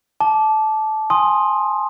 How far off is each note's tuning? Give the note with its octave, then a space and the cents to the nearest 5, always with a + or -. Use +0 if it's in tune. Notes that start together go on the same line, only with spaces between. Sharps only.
A5 -20 D6 +0
G#5 +0 C6 +15 D#6 +0